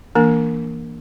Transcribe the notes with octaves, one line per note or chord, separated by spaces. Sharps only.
E3 A#3 D4 A#4